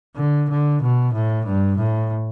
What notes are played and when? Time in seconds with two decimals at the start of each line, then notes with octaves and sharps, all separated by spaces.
0.16 D3
0.50 D3
0.82 B2
1.14 A2
1.46 G2
1.78 A2